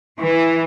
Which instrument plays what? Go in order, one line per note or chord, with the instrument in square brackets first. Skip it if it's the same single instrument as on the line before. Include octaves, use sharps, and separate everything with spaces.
[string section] E3